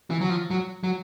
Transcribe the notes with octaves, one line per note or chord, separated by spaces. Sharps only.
E3
F#3
F3
F#3
F#3